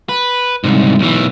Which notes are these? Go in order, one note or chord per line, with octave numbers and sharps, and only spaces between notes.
B4
C2 G#2
B1 E3